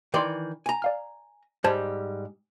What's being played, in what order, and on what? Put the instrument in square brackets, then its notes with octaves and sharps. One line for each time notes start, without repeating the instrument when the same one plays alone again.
[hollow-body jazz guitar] D#3 E3 D5 [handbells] G5 C6 D6
[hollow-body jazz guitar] G#5 A#5
[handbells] D5 F5 F6
[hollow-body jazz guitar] G#2 G3 [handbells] C5 A5 G#6